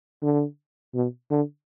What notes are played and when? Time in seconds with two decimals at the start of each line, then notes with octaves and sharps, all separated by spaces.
0.22 D3
0.95 B2
1.31 D3